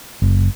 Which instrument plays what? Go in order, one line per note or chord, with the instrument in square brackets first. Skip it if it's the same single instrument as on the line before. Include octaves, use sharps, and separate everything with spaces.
[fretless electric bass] F#1